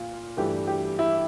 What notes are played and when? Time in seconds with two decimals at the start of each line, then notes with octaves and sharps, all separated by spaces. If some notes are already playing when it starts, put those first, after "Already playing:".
Already playing: A#2 F4
0.37 G2 E3 A3 G4
0.67 G4
0.99 E4